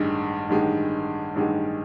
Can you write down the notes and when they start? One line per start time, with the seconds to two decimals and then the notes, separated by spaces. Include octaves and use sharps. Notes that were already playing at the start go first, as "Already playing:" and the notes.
Already playing: A1 G2 D#3 G#3
0.49 A1 G2 D#3 G#3
1.35 A1 G2 D#3 G#3